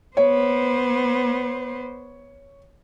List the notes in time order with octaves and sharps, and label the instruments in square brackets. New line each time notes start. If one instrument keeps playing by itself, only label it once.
[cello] B3 C5 [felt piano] C#5